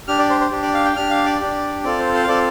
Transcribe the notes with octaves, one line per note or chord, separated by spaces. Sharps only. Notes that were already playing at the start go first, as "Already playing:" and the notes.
D4 G4 F6
D5
C5
C5
D4 G4
D5
F5
G5
D4 G4 F6
F5
D5
D4 G4
C4 F4 A4 D5
C5
C5
F5
C4 F4 A4 D5